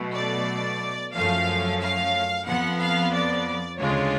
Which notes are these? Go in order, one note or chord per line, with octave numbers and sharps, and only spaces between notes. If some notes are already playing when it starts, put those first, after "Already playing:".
Already playing: B2 F#3 A3
D5
F#2 F3 A3 C#4 F5
F5
F2 F3 B3 F#5
F5
D5
D2 C#3 G#3 D4 F4 C#5